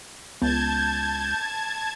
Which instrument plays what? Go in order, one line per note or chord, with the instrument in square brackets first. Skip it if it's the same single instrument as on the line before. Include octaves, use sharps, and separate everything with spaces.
[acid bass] C#2 [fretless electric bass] B3 [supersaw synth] A5 G#6 [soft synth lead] G6